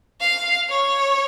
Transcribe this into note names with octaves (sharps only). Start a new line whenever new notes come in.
F5
C#5